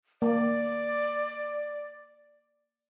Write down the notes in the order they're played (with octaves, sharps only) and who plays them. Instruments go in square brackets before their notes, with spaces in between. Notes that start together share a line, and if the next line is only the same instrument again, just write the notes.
[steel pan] A#3 [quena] D5